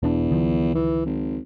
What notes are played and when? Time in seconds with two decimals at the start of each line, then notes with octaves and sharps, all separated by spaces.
0.03 E1 E2 D4
0.30 C#2 D#3 F3
0.75 E3
1.06 G#1